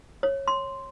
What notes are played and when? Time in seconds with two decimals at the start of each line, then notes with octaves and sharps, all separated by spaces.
0.23 C#5
0.48 C6